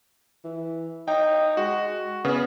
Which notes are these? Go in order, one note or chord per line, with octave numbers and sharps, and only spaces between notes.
E3
D#4 G5
G#3 F#4
C#3 B3